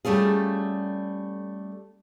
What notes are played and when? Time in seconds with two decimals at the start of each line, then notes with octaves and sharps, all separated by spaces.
0.05 G3 A3 C#4 F4 G#4